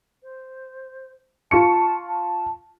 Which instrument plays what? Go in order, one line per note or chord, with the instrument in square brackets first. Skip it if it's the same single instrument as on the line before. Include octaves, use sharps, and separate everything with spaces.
[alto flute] C5
[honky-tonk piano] F4 C#6 C#7 [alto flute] A5
[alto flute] A5